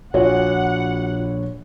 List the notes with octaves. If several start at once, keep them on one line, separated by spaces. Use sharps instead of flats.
A#1 F4 F#4 C#5 F#5